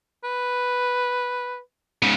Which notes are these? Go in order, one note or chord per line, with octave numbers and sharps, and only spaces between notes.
B4
G#2 C#3